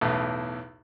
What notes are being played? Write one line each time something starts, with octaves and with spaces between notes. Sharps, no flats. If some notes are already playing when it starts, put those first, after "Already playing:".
B1 E2 A2